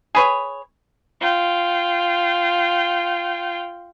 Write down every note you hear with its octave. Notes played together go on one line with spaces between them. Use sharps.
G#4 B4 C#5
F4 G5